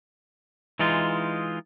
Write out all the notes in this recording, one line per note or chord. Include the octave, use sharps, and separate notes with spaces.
E3 G#3 D#4 F4